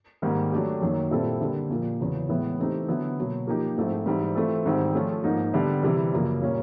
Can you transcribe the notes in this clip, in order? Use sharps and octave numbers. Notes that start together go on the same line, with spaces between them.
G#2 D#3 G3 A#3
F#3 A3 D4 G4
F#2 D#3 F#3 A#3
A#2 G3 C4 E4 A4
D3 G3 A#3
A#2 F3 A#3
E2 C#3 F#3
A2 E3 G#3 B3 E4
E3 A3 C4 D#4 G4
D3 F#3 B3 E4
B2 F#3 A#3
F3 A#3 D#4 G4
G#2 F3 A3 C4 E4
G#2 E3 G3 C4
E3 A3 C4 F4 A4
G#2 D#3 G3 C4
F3 A3 C#4 F4
G#2 F3 A#3 D#4
D3 G3 B3 D4
C3 E3 G3
F#2 C#3 F3 A#3
A#2 G3 A#3 C#4